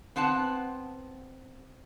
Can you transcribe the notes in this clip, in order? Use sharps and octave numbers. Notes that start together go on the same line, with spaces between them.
B3 C4 F#5 A5